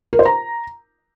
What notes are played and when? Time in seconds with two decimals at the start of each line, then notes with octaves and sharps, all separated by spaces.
0.13 A#4
0.19 C5
0.25 A#5